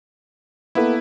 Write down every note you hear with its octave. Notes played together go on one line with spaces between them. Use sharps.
A#3 B3 E4 A4 B4